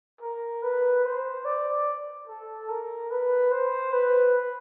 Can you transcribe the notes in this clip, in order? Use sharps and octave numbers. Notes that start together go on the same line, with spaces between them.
A#4
B4
C5
D5
A4
A#4
B4
C5
B4